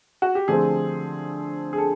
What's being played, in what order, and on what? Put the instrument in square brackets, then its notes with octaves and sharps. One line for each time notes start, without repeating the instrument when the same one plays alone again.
[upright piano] F#4
G4
D3 F3 A3 C4 G#4
G#4
A4